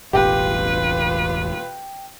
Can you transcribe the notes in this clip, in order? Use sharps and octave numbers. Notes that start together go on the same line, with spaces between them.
E1 A1 E2 F4 G4 B4